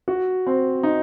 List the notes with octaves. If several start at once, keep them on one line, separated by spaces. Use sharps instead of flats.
F#4
C4
D#4